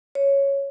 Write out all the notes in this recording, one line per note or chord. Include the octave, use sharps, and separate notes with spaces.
C#5